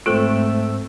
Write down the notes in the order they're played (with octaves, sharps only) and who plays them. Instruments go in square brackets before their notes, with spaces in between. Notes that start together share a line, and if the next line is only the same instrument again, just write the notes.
[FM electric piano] G#2 C4 E6 [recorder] A3 [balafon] F4 A4